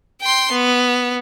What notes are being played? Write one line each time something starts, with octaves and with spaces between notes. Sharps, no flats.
G5 C6
B3